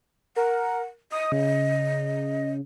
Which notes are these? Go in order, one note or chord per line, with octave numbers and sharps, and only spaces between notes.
A#4 F#5
D#5 D#6
C#3